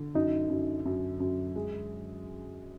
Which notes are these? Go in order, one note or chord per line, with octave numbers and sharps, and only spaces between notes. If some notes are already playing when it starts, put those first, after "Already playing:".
Already playing: D3
F#2 D#4
F#2
F#2
F#2
G#3